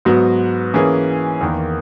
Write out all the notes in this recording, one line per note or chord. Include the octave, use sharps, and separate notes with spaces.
G#2 F#3 B3 F#4
E3 A#3 C#4 G#4
E2 D#3 A#3